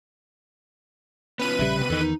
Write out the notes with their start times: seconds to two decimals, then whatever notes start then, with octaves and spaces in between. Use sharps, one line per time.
1.39 B3 C#4 F4 B4 D#7
1.59 A#1 C#3 G3 E5
1.78 C3 B3
1.90 E2 D#3 A4 D#5
2.01 D#4